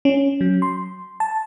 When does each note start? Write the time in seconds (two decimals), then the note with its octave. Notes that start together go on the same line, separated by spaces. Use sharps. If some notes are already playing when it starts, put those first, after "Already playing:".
0.05 C#4
0.41 F#3
0.62 C6
1.20 A5